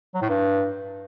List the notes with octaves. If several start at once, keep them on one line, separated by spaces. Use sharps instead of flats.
F#3
A2
G2